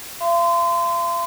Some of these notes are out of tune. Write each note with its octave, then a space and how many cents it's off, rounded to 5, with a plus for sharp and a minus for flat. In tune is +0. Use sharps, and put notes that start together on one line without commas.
F5 -45 C6 -30